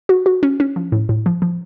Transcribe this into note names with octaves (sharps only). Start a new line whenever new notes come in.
F#4
F#4
C#4
C#4
F3
A2
A2
F3
F3